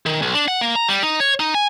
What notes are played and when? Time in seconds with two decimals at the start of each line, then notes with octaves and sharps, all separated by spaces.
0.06 D#3
0.22 B1
0.34 D4
0.48 F#5
0.61 A#3
0.76 A#5
0.89 G3
1.03 D#4
1.20 C#5
1.40 D#4
1.55 G#5